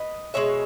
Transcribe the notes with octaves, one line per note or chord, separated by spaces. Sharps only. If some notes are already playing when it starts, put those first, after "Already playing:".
Already playing: B4 D#5
B2 G#3 C#5 E5